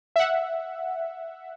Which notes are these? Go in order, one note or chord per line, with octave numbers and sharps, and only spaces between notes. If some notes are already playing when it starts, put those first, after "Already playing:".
E5 F#5